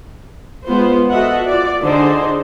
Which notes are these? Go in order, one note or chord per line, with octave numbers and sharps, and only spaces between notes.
G#3 B3 F4 C5
F#4 A4 D#5 E5 F#5
F4 D5
D3 D#4 G#4 C5